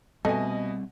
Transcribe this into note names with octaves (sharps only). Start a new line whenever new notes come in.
B2 G3 A3 C4 D#5 G#5